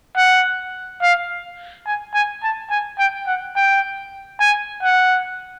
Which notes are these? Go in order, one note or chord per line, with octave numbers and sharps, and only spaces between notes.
F#5
F5
G#5
G#5
A5
G#5
G5
F#5
G5
G#5
F#5